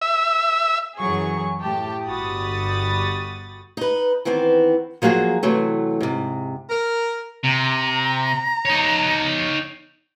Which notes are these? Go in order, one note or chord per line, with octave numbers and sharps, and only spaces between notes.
E5
F#2 E3 F#3 G#4 C#6
A2 G4 G5 A5
G1 F#4 G4 B5 D#6 A6
D#4 B4
D#3 E3 B3 C4
F3 F#3 A#3 F#4 G#4
C3 E3 F#3 A3
G#2 C3
A#4
C3 A#5
D#4 C#5